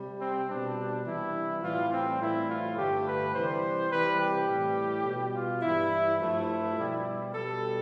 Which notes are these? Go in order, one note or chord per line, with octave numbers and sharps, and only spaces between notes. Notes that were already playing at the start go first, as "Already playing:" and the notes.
Already playing: C3 G3
C4
B2 G3 D4
C3 E3 G3 E4
A2 E3 G3 F4
C4
A2 E3 G3 E4
F4
G2 D3 A3 G4
B4
C3 E3 G3 C5
C3 E3 G3 B4
G4
A2 E3 G3
B2 G3
F4
G2 E3 G3 E4
G2 F3 A3 E4
B2 G3
B2 G3 A4